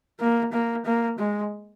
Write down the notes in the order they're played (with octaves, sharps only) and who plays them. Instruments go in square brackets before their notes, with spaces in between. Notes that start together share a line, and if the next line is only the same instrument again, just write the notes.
[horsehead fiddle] A#3
A#3
A#3
G#3